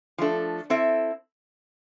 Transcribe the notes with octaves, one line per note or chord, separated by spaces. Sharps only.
F3 A3 D4 A4
C4 E4 A4 E5